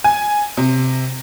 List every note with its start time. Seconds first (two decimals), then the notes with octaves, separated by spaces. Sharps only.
0.04 G#5
0.57 C3